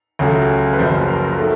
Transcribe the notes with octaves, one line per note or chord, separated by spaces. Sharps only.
C#2 C#3 F#3 A3
B4
F#1 F#2 C#3 F3 C5
A#4
D#3 F#3 A3